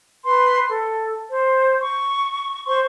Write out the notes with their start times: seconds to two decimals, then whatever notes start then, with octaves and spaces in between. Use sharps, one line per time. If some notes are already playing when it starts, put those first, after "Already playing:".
0.24 B4 C6
0.68 A4
1.29 C5
1.80 C#6
2.66 C5 C6 C#6